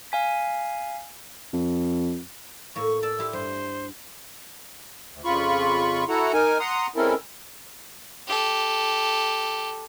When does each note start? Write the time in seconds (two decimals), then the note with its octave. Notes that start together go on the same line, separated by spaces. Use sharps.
0.12 F5 G#5 B6
1.53 F2
2.76 A2 A#3 C#6
3.03 D5 A5 E6
3.19 E4 G4 C6
3.33 G2 C5
5.12 D2
5.24 F2 C#3 F4 B5 C#6
6.08 E4 F#4 A4 F#5 A#5
6.33 D#4 A#4 G#5
6.60 F#5 A#5 C6 D#6
6.96 G#3 C4 C#4 E4 A4 A#4
8.27 G4 A4